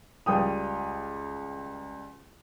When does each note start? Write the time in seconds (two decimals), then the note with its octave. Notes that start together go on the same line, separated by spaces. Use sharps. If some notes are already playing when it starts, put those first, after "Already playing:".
0.26 C#2 G3 G5 D#6